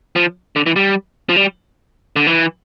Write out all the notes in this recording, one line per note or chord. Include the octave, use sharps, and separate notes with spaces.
F3
D3
E3
G3
F3
G3
D3
E3